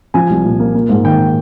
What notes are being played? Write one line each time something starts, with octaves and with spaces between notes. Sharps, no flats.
F3 G#5
C2
A#2
A#3
A#3
G#2
D#3 G5